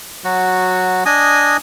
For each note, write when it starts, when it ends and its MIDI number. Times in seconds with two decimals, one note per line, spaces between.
0.24 1.04 54
0.24 1.04 66
1.06 1.57 62
1.06 1.57 75
1.06 1.57 80
1.06 1.57 87